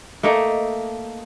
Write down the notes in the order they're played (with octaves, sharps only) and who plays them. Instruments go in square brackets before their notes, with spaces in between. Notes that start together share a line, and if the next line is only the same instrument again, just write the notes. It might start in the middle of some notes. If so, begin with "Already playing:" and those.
[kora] A3 A#3 D#4 A4